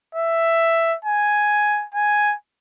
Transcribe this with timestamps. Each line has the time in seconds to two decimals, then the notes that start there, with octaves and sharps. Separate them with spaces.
0.15 E5
1.05 G#5
1.95 G#5